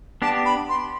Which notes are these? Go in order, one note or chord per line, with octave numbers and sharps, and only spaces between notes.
B3 D4 G4 A5
B5
C6